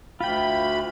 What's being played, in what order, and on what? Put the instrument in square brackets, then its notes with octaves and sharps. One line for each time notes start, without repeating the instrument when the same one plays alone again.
[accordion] D2 B5 [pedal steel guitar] F4 G5